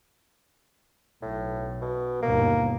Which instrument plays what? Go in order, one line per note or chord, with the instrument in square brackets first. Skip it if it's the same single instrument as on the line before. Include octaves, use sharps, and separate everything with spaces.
[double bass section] B1 [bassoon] A2
[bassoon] B2
[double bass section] G1 D#2 B2 [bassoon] A#3